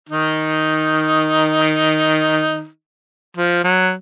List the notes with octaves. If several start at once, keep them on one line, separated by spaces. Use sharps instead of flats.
D#3 D#4
F3
F#3